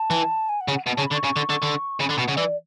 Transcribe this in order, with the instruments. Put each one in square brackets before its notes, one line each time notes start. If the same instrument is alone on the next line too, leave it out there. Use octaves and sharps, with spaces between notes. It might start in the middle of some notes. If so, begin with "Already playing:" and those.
Already playing: [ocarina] A5
[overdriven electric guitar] E3
[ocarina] G#5
F#5
[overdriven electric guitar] C#3
[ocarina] F#5
[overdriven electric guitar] B2 [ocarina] F#5
[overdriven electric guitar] C#3 [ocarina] A5
[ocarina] B5
[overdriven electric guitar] D3
[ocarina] C#6
[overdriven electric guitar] C#3
D3
D3
D3
[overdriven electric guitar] C#3 [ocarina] B5
[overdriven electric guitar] D3
[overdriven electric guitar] B2 [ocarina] F#5
[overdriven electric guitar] C#3
[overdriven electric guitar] E3 [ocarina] D5